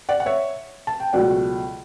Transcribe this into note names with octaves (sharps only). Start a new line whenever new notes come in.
D5 F#5
F#5
C#5 E5
A5
G5
C#2 B2 F#3 A3 D5 F#5